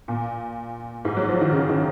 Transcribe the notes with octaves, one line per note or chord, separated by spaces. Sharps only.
A#2
G#2
F#3
F3
D#3
C#3
D#3